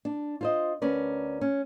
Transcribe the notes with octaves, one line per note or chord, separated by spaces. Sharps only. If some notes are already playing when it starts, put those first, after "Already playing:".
D4
F4 C5 D#5
D2 C#4 A#4 B4 D5
C#4